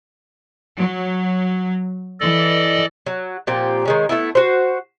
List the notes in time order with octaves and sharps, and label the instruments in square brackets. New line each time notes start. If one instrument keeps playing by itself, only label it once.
[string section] F#3
[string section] E3 [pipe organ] A4 D5 D#5
[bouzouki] F#3
A#2 F3 C4 G4
D#3 G#3 C#4
A3 B3 E4
F#4 C5